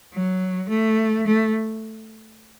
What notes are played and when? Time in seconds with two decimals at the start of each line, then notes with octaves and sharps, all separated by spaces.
0.13 F#3
0.69 A3
1.26 A3